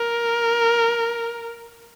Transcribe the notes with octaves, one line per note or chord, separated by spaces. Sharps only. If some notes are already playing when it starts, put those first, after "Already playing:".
Already playing: A#4